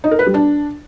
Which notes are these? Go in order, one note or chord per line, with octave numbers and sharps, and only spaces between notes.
D#4
A#4
B4
G3
D4